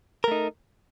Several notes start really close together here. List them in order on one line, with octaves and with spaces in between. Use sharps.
A#4 A3 D#4